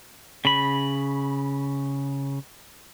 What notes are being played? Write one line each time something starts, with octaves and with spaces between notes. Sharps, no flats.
C#3 B5